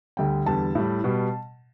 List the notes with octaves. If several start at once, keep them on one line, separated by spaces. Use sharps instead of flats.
D2 D3 G3 G5
E2 D3 G3 A5
A2 G3
B2 G3